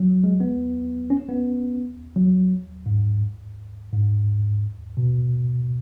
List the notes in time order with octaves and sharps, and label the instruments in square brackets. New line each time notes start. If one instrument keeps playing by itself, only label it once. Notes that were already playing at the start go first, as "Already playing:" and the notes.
Already playing: [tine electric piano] F#3
G#3
B3
C#4
B3
F#3
G#2
G#2
B2